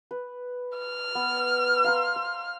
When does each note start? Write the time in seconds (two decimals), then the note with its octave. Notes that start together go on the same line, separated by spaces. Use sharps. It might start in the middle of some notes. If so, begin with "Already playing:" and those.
0.11 B4
0.78 F6
1.15 B3
1.84 F5 A#5 C6
2.16 C5